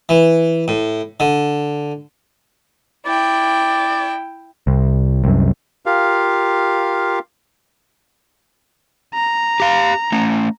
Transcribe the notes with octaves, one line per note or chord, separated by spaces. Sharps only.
E3
A2
D3
E4 D5 G5
C2
C2 F#2
F4 G4 A#4 F5
A#5
G4 F5
A3 C#4